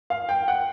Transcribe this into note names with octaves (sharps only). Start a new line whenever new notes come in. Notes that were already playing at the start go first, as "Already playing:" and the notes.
F5
G5
F#5